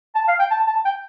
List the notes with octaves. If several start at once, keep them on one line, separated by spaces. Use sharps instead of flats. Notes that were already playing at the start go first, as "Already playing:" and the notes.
A5
F5
G5
A5
A5
G5